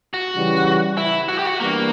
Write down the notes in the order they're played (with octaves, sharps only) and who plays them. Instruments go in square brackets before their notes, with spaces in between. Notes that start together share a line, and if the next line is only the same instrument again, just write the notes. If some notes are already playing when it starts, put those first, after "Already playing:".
[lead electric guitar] F#4
[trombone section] C#3 E3 G3
[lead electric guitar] E4
F#4
G4
F#4
[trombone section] E3 G3 B3 D4 [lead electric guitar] A#3